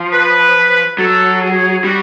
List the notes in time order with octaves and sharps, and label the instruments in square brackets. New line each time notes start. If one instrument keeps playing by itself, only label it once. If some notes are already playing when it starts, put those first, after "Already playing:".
Already playing: [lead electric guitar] F3
[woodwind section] B4
[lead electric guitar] F#3 [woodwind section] A4
[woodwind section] G#4
[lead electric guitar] G3 [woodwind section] F#4